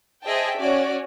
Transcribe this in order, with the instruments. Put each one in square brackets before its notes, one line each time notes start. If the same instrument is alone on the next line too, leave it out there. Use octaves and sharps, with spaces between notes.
[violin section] G#4 C5 D#5 E5 G5 A5
C#4 F#4 D5